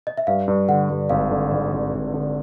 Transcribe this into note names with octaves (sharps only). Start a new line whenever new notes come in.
D#5
E5
G2 F5
G2
D3 F#5
G2
G#1 F5
D3
G#1
G#1
G#1
D3